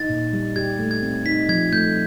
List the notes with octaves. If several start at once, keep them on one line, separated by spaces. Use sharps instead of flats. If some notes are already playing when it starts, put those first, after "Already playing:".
Already playing: D#4 A6
A#2
G3
G4 G#6
A3
G#6
C4
D#4 B6
F3 G#6
A3 G6